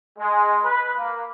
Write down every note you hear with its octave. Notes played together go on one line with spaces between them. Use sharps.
G#3
B4
A#3